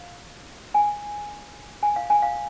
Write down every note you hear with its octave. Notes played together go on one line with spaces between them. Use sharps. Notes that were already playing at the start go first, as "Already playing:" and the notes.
Already playing: F5
G#5
G#5
F5
G#5
F5